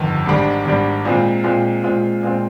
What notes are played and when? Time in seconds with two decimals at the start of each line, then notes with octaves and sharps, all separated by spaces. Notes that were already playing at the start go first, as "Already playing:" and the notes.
Already playing: G1 F2 D#3
0.26 G#1 G#2 G3 D4
0.65 G#1 G#2 G3 D4
1.05 A#2 G#3 C4 F4
1.44 A#2 G#3 C4 F4
1.83 A#2 G#3 C4 F4
2.23 A#2 G#3 C4 F4